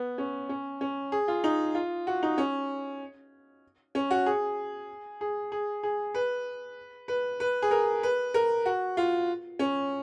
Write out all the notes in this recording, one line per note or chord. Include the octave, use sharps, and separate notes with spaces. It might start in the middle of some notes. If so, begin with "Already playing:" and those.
Already playing: B3
C#4
C#4
C#4
G#4
F4
D#4
F4
F#4
D#4
C#4
C#4
F#4
G#4
G#4
G#4
G#4
B4
B4
B4
G#4
A#4
B4
A#4
F#4
F4
C#4